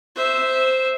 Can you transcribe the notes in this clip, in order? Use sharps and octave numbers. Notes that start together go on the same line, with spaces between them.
C5 E5